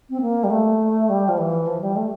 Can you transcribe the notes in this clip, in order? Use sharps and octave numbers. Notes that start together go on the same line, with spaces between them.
C4
A#3
G3
A3
G3
F3
E3
F3
G3
A3